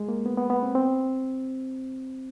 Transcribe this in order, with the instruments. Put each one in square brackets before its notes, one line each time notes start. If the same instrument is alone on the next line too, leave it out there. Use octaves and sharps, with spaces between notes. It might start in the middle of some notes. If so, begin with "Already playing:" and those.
Already playing: [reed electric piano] G#3
A#3
B3
B3
B3
C4
C4